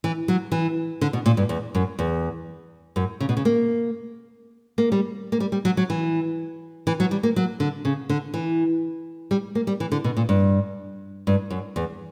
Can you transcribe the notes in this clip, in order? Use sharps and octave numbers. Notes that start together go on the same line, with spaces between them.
E3
F#3
E3
D3
B2
A#2
G2
E2
F#2
E2
F#2
C#3
B2
C#3
A#3
A#3
G3
A#3
G3
G3
F#3
F#3
E3
E3
F#3
G3
A#3
F#3
D3
C#3
D3
E3
G3
A#3
G3
E3
D3
B2
A#2
G2
G2
F#2
E2